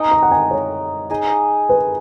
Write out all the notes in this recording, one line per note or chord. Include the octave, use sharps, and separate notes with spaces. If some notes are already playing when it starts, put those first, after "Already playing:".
Already playing: D#4 A#4 D#5 G#5
A#5
F#5
G#5
C#5
D#4 G#4 D#5
B4